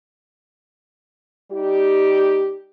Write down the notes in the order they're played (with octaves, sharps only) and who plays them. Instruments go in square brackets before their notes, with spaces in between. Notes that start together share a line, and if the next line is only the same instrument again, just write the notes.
[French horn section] G3 D#4 G4